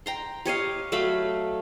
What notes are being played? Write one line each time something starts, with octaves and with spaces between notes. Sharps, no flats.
G5 A#5 C6
G4 C#5 D#5 F5
F#3 A3 F5 B5